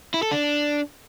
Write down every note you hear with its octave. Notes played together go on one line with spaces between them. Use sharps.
E4
A4
D4